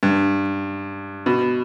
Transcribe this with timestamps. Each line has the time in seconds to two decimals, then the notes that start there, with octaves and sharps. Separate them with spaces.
0.03 G2
1.26 B2